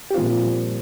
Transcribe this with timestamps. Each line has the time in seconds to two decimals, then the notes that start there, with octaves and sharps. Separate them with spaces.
0.11 G4
0.14 A#2 F3 C4 F4
0.43 G3